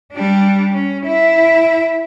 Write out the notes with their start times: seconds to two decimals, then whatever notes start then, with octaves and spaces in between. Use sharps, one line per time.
0.13 G3 D4
0.73 C#4
1.05 E4 E5